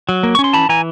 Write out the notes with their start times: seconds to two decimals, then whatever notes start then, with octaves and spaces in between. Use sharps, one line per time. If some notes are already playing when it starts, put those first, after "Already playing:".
0.09 F#3
0.23 A#3
0.35 C#6
0.39 C#4
0.44 C6
0.53 E3 A5 B5
0.69 E3 G#5 A#5